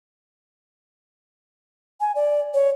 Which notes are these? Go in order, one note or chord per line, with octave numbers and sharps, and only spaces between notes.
G#5
D5
C#5